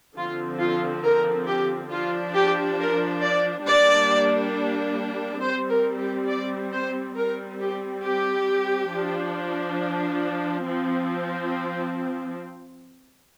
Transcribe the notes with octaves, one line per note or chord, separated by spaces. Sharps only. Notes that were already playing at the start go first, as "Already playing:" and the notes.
D3 F3 C4 F4
F4
A#4
G4
F3 D4 F4
G4
A#4
D5
G3 A#3 D4 D5
G3 C4 C5
A#4
G4
D5
C5
G3 C4 A#4
G4
G4
F3 D4
F3 C4